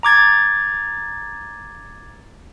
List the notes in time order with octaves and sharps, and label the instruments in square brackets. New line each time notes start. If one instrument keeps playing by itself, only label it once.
[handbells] A#5 D6 G#6 A6